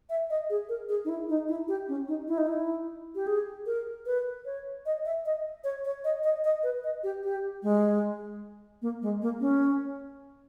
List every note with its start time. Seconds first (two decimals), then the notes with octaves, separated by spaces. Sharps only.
0.10 E5
0.30 D#5
0.50 G#4
0.69 A#4
0.89 G#4
1.05 D#4
1.09 E4
1.29 D#4
1.48 E4
1.68 G4
1.88 C#4
2.08 D#4
2.28 E4
2.38 D#4
2.47 E4
3.15 G4
3.27 G#4
3.66 A#4
4.06 B4
4.45 C#5
4.86 D#5
5.05 E5
5.26 D#5
5.64 C#5
5.85 C#5
6.04 D#5
6.24 D#5
6.44 D#5
6.63 B4
6.84 D#5
7.03 G4
7.24 G4
7.63 G#3
8.82 A#3
9.02 G#3
9.22 A#3
9.41 C#4